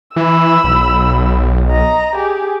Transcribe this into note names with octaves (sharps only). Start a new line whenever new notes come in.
E3 B5 E6
B1
D#5 A#5
G4 G#4